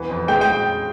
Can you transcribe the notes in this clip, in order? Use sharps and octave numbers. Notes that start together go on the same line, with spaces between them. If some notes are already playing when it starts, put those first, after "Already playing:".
Already playing: E2 E3
F2
G#3 G5
G5